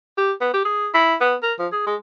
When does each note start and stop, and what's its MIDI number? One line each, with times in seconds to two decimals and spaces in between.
0.18 0.32 67
0.41 0.52 59
0.54 0.63 67
0.65 0.89 68
0.94 1.15 64
1.21 1.35 59
1.43 1.53 70
1.59 1.68 53
1.72 1.83 68
1.87 1.95 56